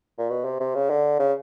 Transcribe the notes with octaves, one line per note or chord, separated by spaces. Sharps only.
A#2
B2
C3
C3
C#3
D3
C#3